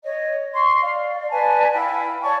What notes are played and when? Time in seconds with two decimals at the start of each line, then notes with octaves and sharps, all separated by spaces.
0.05 C#5 D#5
0.53 C6 C#6
0.81 D5 F5
1.30 B4 D5 G#5 A5
1.72 E4 F5 G5 B5
2.23 C#5 D5 A5 C#6